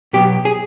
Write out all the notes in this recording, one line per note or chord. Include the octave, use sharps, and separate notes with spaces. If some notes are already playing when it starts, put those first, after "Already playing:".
B2 F#3 B3 G4
G#4